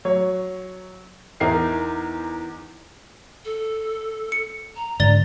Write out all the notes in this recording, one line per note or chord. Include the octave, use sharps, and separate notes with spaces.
F#3 C#5
E2 D#4 A#4 C7
A4
C#7
A#5
G#2 D3 D5 A6 G7